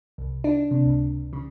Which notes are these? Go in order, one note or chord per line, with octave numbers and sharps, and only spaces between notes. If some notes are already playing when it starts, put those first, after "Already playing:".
C2
D4
C3
C#2
C#3